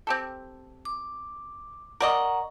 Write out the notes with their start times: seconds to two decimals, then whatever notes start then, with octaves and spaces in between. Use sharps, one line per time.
0.07 C4 G4 A4
0.85 D6
2.01 A#4 D5 D#5 F#5 A#5 C#6